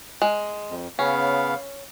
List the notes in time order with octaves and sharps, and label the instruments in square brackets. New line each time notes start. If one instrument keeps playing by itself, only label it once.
[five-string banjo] G#3
[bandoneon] F2
[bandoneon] C#3 B3 F5 [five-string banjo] C#4